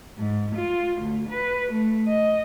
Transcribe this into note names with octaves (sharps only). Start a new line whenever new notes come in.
G#2
F4
D2
B4
A3
D#5